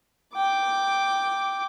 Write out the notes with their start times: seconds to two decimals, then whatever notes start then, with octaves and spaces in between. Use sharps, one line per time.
0.35 G5 D6